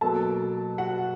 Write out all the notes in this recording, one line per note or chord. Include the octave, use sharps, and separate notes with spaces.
B2 F#3 A#3 A4 A5
F#4 F#5